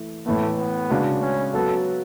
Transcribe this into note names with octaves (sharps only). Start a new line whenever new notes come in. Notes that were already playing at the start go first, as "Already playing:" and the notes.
Already playing: E3 A3 E4
A2 E3 A3 B3
B3
C#3 G#3 D4 F#4
C#4
F#3 B3 F#4 A4